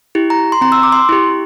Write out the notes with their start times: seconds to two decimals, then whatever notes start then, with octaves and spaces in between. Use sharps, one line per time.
0.15 E4 G4
0.30 A#5
0.52 C6
0.61 C4 A#5
0.72 E6
0.83 D6
0.92 C6
1.09 E4 G4